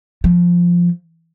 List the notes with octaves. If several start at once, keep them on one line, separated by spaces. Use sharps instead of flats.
F3